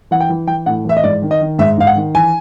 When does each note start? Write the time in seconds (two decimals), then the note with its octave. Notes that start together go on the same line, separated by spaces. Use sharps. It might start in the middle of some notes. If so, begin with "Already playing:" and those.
0.11 E3 F#5
0.20 G5
0.30 E3
0.47 E3 G5
0.66 A2 F#5
0.85 E3 E5
0.97 D#5
1.03 G#2 D5
1.22 D#3
1.31 D#5
1.41 D#3
1.59 G#2 E5
1.78 G#2 F5
1.87 F#5
1.96 D#3
2.15 E3 G#5